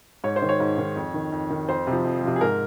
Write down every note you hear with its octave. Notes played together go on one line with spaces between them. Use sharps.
G#2 C#5
C5
D#3
C#5
G#2
D#3
F2
D#3
F2
D#3
F2 C5
C3 F3
F2
C3 F3
G#4
G#2 A#4